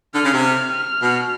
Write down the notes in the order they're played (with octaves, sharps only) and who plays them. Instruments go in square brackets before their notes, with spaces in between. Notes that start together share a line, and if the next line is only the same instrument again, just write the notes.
[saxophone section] D3 [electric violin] F6
[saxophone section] C#3
C3
[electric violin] F6
F6
[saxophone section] B2